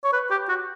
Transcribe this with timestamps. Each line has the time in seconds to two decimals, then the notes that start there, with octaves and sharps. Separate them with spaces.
0.04 C#5
0.13 B4
0.31 G4
0.49 F#4